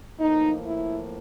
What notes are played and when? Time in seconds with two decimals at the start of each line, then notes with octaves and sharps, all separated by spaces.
0.20 A2 F3 A#3 D#4
0.66 E4